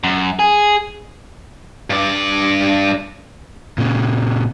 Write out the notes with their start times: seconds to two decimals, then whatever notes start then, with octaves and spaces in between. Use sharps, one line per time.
0.04 F#2
0.39 G#4
1.90 G2 D5
3.78 A#2 C#3